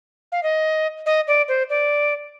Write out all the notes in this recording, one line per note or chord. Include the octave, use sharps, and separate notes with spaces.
F5
D#5
D#5
D5
C5
D5